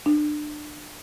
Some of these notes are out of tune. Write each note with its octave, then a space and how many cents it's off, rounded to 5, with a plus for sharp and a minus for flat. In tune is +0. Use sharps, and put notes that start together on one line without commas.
D4 +30